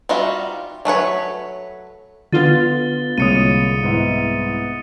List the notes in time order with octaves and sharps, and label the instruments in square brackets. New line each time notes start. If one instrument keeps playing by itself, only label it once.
[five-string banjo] G3 D#4 F4 F#4 E5
F#3 A3 B4 C#5
[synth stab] D3 F4 [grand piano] B3 D#7 [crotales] A6 G7
[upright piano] C2 [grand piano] G#3 A#3 C#5 [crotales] D#6 C#7 D#7
[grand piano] G#2 B3 E4